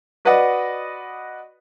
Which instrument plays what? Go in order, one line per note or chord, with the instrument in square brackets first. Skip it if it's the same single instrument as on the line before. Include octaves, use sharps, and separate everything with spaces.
[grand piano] F#4 B4 D5 D#5 F#5